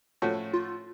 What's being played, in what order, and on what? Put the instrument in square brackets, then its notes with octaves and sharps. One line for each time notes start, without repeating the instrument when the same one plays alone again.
[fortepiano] A2 F3 A3 C#4 F#4
[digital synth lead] F4